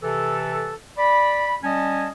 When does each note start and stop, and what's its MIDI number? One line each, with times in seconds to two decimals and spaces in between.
0.03 0.74 48
0.03 0.74 52
0.03 0.74 69
0.98 1.56 74
0.98 1.56 83
1.63 2.08 55
1.63 2.08 61
1.63 2.08 75
1.63 2.08 80
1.63 2.08 81